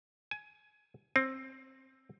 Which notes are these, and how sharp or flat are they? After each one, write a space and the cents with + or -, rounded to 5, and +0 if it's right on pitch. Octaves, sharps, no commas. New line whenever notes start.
G#5 +20
C4 +15